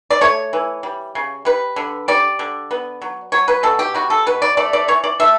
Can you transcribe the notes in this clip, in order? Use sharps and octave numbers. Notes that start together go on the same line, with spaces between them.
D5
A3 C#5
E3
G3
C#3
G3 B4
D3
G3 D5
D3
B3
F#3
F#3 C#5
B4
B2 A4
G4
G3 F#4
A4
B2 B4
D5
A3 D5
D5
E3 C#5
D5
A3 E5